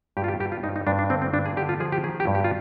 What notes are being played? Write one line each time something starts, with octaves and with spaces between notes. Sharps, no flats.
G2 G4
F4
G4
G2 G4
F4
G2 D#4
D#4
G2 D4
D4
D3 C4
C4
G2 D4
G#4
D3 G4
F4
F3 G#4
G4
D#3 G#4
G4
G2
G4
F4